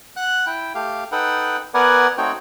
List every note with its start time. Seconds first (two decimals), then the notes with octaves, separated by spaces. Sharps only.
0.16 F#5 F#6
0.46 E4 G5
0.75 A3 G4 F5
1.12 D#4 A4 B4 F#5 G5
1.74 B3 A#4 B4 D5 F#5 G#5
2.18 A3 C4 D#4 F#4 C#5 G5